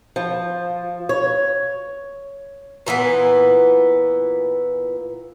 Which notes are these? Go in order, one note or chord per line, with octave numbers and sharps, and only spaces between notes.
F3
C#5
A#2 E3 A#3 B3